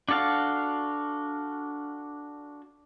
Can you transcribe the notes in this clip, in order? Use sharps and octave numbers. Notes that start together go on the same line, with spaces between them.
D4 F#4 A4 F5